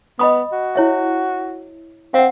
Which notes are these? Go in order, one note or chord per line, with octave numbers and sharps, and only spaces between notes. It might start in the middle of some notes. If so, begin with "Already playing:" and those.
B3 D#5 B5 D#6
F#4
E4 C#5 E5
C4 F5 F#5